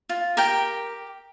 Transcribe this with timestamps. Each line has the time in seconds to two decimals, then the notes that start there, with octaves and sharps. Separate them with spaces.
0.09 F4
0.37 G4 A#4 G5